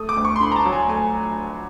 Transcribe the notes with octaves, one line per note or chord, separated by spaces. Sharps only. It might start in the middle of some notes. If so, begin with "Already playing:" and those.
Already playing: A3 D#6
D6
D2
C#6
C6
D3 B5
A#5
A5
F#3
G#5
A3 G#5